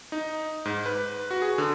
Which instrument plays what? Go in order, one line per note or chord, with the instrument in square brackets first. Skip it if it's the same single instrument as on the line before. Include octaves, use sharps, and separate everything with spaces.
[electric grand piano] D#4
G#2
B4
F#4
G#4
D3